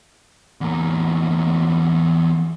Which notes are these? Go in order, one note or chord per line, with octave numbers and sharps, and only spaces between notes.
E2 A#3